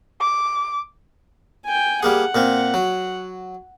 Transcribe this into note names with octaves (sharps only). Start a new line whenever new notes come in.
D6
G5 G#5
G3 A#3 G#4 F#5
A#2 A#3 C4
F#3